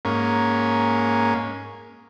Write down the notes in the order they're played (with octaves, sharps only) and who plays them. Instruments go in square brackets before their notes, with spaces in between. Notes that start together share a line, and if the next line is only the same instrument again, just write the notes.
[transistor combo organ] G#2 A#3 C#4